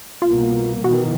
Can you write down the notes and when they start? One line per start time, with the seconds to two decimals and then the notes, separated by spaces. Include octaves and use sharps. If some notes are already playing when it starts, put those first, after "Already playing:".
0.22 C2 B2 A#3 F4
0.84 B2 D#3 E3 F#4